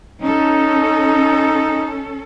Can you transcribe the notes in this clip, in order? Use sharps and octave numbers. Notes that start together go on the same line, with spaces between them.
C#4 D#4 A4